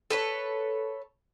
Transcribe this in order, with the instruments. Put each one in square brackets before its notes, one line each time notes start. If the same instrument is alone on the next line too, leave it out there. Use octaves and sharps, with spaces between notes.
[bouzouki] A4 B4 C#5